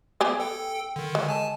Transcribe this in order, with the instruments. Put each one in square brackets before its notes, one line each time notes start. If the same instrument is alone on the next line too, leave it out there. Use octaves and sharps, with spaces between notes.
[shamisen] B3 G4 G#4
[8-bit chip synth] A4 G5
D3 D#3
[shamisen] G#3
[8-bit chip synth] G#5 A5